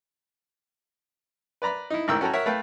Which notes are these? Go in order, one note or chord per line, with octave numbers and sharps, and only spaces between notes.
B4 D5 A#5 B5
D#4 E4
A1 G#2 D#3 G5 E6
C#4 F#4 A4 G5 A#5
A#4 C#5 E5 F#5
A3 B4 F5 G5